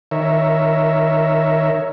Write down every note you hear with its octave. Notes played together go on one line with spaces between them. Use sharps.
D#3 A#4 C#5 E5